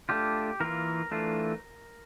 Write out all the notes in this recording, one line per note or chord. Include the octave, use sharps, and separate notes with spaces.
A3 D4 F4 G4
E3 A#3 F4 A#4
E3 A3 D4 F4